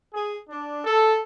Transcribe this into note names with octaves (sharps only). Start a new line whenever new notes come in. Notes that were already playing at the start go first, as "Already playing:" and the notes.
G#4
D4
A4